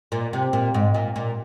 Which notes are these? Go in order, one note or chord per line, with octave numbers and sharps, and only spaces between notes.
A#2
C3
A#2
G#2
A#2
A#2